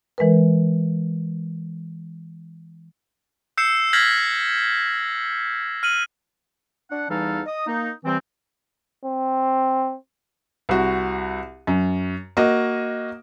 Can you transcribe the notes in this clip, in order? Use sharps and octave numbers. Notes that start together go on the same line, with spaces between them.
E3 G#3 A#4 B4
E6 G6 C7 C#7 E7
F6 G6 G#6 A#6 B6 F#7
F6 D#7 F#7
D4 F#5
E2 E3 G3 D#4 A4 F5
D#5 D#6
A#3 D#4
C3 E3 G3 C4
C4
C2 F#4
F#2
A#3 F#4 D#5